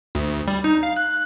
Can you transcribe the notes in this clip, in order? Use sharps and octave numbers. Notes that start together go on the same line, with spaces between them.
D2
G3
D#4
F5
F#6